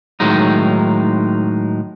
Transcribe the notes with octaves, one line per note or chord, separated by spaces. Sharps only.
A2 D#3 F#3 G#3 D#4